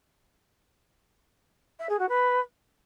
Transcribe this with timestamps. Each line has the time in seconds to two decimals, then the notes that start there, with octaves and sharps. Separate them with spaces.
1.79 E5
1.89 G#4
1.99 F#4
2.09 B4